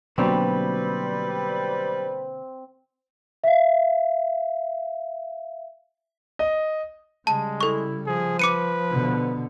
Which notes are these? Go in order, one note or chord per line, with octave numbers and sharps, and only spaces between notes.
B2 D3 F#3 G3 A#3 C4 D4 B4
E5 F5
D#5
C#3 G3 G#3 A5
E4 A4 C#6
F3 G#4
B4 D6 C#7 D#7
B2 D3